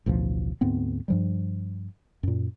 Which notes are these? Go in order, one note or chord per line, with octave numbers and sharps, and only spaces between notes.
A1 D2 B2 F3
D2 G#2 B3 C4
G2 F3 G3
F#2 A#2